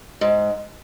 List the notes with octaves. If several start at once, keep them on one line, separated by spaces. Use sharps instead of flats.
G#2